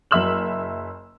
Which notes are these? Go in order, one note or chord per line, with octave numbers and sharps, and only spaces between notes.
F#1 F#3 E5 E6 F6 F#7